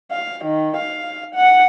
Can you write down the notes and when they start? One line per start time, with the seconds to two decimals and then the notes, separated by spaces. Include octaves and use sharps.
0.12 F5
0.45 D#3
0.77 F5
1.35 F#5